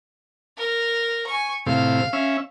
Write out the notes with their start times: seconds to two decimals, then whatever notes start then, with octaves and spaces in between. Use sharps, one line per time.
0.58 A#4
1.27 G#5 C#6
1.66 A2 C3 F5
2.13 C#4 E5